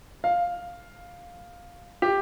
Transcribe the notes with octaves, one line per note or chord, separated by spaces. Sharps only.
F5
G4